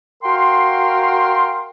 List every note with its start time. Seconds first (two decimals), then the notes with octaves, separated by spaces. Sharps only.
0.23 F#4 A#4 F5 G5 C6